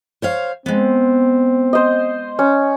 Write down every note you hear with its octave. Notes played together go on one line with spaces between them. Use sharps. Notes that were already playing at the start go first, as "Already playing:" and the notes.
C5 C#5 F5
G#3 B3 C4
C5 D#5
C#4